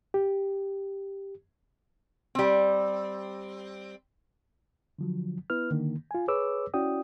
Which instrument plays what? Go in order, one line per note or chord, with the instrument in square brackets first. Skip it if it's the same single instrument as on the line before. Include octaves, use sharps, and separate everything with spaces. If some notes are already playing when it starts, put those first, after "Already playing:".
[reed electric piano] G4
[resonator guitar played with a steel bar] G3 C4
[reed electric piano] D3 F3 F#3
B3 E4 B4 F6
D3 D#3 A#3
F4 G#5
G#4 B4 C#5 D6 E6
C#4 E4 F#4 D5 G5 D#6